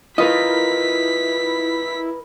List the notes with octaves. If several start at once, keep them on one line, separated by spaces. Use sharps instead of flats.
E4 F4 A#4 B4 D#5 B6